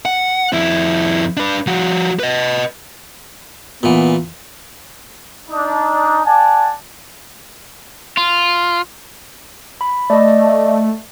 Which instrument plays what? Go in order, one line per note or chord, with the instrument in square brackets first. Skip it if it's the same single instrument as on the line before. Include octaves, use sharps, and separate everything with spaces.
[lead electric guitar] F#5
F2 E4
D4 B4
F3 F#4
B4 D#5
[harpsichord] A#2 E3 [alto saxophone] B3
[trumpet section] D4 D#4
D5 F#5 G#5 A5
[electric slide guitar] F4
[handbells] B5
[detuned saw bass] A3 [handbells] D5 D#5